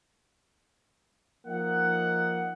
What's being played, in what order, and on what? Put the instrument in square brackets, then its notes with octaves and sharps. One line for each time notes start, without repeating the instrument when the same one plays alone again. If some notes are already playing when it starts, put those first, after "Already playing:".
[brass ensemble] F3 A#3 D#4 D#5 F#5